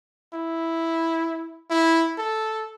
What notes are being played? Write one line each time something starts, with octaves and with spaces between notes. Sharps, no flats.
E4
E4
A4